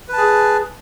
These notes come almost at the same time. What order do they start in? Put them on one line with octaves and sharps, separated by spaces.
B4 A5 G#4